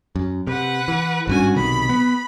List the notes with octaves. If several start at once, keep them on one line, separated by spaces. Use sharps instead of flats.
F#2
C3 B4 F#5
E3
G#1 G2 C#4 F#4 G#5
B1 C3 D#3 B5
B3